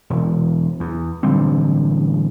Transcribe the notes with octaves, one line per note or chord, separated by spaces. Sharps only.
E1
E2
A1 D3 G3 C4